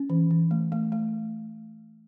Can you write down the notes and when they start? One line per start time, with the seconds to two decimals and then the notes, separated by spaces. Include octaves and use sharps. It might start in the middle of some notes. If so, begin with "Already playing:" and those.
Already playing: C#4
0.10 E3
0.31 E3
0.51 A3
0.72 A3
0.92 A3